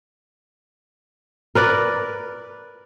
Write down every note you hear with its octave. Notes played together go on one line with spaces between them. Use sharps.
A#4 B4 D5